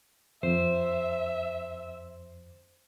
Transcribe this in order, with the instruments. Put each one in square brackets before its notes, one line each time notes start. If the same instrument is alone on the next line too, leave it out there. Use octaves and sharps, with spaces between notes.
[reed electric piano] F2 [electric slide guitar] C5 [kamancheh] E5